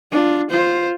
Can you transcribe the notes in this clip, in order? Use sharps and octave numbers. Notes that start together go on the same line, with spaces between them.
D4 F4
F4 C5